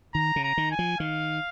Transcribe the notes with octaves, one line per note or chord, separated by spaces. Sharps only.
D#3 A#5
C#3
A#5
D#3
G#5
F3
D#3 F5